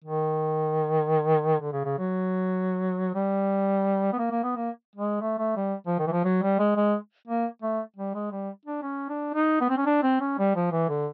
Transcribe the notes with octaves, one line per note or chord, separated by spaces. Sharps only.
D#3
D3
C#3
C#3
F#3
G3
B3
A#3
A#3
B3
A#3
G#3
A3
A3
G3
F3
D#3
E3
F3
F#3
G3
G#3
G#3
A#3
A3
G3
G#3
G3
D4
C#4
D4
D#4
B3
C4
C#4
D4
C4
C#4
G3
F3
E3
D3